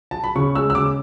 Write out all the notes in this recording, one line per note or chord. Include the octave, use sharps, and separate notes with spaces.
A5
B5
C#3 C#6
G#3 E6
E6
C#3 D6